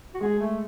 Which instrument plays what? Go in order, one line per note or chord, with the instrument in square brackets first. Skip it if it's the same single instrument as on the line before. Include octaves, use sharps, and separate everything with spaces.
[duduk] F#4
[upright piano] G#3 [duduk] G#4
[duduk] A3